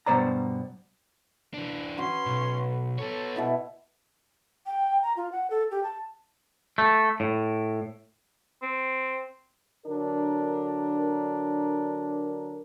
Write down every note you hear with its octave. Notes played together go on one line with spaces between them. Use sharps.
G2 B2 C5 D5 A#5
E3 D4
C#4 F#4 B4 C6
B1
B3 A4 C#5
B2 E4 E5
G5
A#5
F4
F#5
A4
G4
A5
A3
A2
C4
D3 F#3 D4 A#4